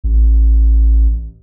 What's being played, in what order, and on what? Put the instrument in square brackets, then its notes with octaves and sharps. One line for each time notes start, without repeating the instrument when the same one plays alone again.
[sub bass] A1